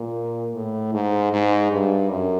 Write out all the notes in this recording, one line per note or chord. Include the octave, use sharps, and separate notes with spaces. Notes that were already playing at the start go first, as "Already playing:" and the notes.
Already playing: A#2
A2
G#2
G#2
G2
F#2